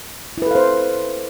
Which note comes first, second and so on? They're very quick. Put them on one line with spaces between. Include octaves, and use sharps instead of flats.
E4 B4 A4 F5 C5